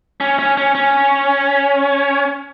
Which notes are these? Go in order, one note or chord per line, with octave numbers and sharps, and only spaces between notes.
C#4
C#4
C#4
C#4